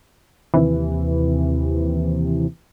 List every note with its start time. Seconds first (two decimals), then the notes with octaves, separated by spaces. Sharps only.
0.54 D#2 C3 E3